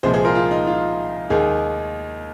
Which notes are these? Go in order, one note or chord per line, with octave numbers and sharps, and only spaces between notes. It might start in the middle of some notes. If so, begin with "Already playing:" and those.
C2 A#2 F3 G#3 G#4 C5
G#4 C5
F4 A#4
F4
D#4
F4
D#2 D#3 G#3 D#4 G#4